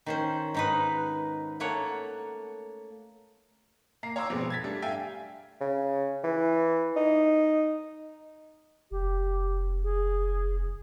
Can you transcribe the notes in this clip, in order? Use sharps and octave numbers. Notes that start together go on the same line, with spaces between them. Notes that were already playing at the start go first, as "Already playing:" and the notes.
D#3 C#4 C5
G#2 D#4 B4
A3 A#3 C#5 F#5
A#3 A#5 C7
C#5 F5 A#5 C6 D6 E6
F2 B2 G#3 B3 C4
G#6 A6 B6
G3 A3 D4
E5 F5 G5 G#5 G#6
C#3
E3
D#4
F1 G4
G#4